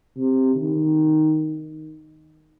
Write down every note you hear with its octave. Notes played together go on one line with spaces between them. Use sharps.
C3
D#3